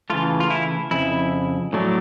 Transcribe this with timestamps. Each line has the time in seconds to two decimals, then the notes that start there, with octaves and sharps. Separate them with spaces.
0.10 C#3 E3 A3 F4
0.40 F4
0.50 E4
0.91 F2 C#3 E4
1.73 A2 F#3 A3 D4